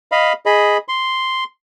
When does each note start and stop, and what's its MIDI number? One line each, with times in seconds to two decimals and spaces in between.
0.12 0.33 75
0.12 0.33 77
0.12 0.33 83
0.46 0.78 68
0.46 0.78 75
0.46 0.78 83
0.88 1.44 84